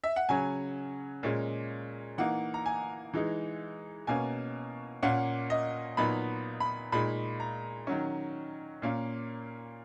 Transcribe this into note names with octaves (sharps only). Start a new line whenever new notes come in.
E5
F#5
C#3 F#3 C#4 G#5
A#2 G#3 C#4
E3 A#3 D#4 F#5
A#5
G#5
E3 G#3 D#4
B2 A#3 C#4 G#5
A#2 A#3 C#4 F#5
D#5
A#2 F#3 B3 D#4 B5
B5
A#2 G#3 D#4 B5
A#5
D#3 F#3 C#4
A#2 A#3 C#4